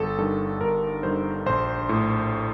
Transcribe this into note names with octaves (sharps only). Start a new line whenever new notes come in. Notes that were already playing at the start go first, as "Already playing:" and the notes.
Already playing: G1 A4
G2 D#3 A4
G1 A#4
G2 D#3 C5
A#1 C5
A2